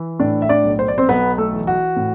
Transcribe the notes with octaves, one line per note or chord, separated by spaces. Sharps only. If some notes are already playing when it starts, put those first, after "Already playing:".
Already playing: E3
A2 D4 D5
E5
D4 D5
B1
C5
D5
C4 C5
B1 B3 B4
A3 A4
E3
F#4
A2